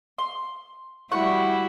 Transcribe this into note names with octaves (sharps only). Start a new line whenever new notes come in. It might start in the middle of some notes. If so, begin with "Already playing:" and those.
C6
G3 E4 F#4 F#5 C#6